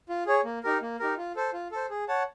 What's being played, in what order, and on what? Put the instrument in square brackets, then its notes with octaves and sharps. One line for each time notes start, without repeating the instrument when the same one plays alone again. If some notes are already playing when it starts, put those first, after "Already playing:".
[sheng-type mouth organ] F4
G#4 C#5
A#3
D#4 G4 A#4
A#3
D#4 G4 A#4
F4
A4 C5
F4
A4 C5
G#4
C#5 F#5 A5